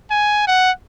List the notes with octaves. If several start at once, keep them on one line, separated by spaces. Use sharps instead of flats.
G#5
F#5